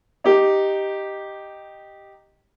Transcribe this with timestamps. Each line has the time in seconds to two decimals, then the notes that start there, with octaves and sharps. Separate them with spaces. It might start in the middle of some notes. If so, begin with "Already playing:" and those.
0.24 D#4 G4